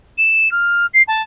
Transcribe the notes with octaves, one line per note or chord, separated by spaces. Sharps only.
E7
F6
C7
A5